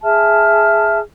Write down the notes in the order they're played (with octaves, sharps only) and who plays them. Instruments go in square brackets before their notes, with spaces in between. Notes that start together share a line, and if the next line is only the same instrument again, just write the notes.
[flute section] G#4 E5 A5 F6